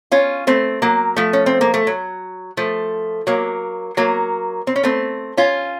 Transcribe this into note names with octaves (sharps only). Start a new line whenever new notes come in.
C#4 F4
A3 C4
F#3 A#3
F3 A3
C#4
C4
A#3
A3
F#3
F3 A3
F#3 A#3
F#3 A#3
C4
C#4
A3 C4
C#4 F4